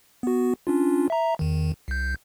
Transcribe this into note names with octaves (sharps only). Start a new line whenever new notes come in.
B3 F#4
C#4 D4 F4
E5 A#5
E2 D#3
C2 G6